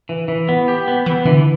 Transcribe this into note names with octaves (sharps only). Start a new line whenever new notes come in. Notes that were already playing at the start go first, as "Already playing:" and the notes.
E3
E3
B3
G4
B3
E3 B3
D3 E3